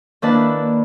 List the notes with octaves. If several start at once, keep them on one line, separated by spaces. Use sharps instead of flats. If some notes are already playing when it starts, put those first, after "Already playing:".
D#3 A#3 D4 E4 B4 A5